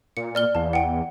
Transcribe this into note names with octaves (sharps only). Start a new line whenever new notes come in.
A#2 C#7
D5 F6 G7
E2 F5 A5
F#5 G5